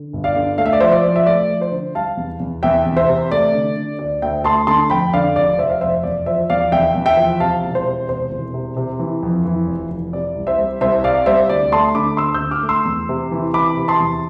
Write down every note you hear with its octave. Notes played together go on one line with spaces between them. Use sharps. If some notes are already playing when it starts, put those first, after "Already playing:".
Already playing: D3
G1
D5 F5
D3
A3 F5
E5
D5
F3 C5 E5
D5
F3
E5
A3 D5
F3
C5
D3
G3 F5 A5
E2
E2
E2 E5 G5
E2
C5 E5
C3
A3 D5
D3
D3
D2 D5
D2 E5 G5
A3 A5 C6
D3 A5 C6
F2 G5 B5
D3 D5 F5
F1 D5
F1 C5 E5
F5
F1 C5 E5
E2 D5
F3 C5 E5
E2 D5 F5
E2 E5 G5
E2
E5 G5
F3
C3 F5 A5
E1
C5
C3
E1 C5
E1
C3
C3
E3
F2
E3
F1
E3
C3 D5
C2
C5 E5
G3
C2 C5 E5
C3 D5 F5
G3 C5 E5
D2 D5
A3 A5 C6
D3 B5 D6
D2 C6 E6
E6 G6
D3
D6 F6
A3
C6 E6
E2
C3
E3
E3 B5 D6
C3
A5 C6
E2